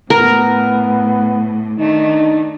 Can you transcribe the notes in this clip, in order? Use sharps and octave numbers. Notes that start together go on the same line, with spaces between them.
A2 B3 A#4
D#3 A3 D4 D#4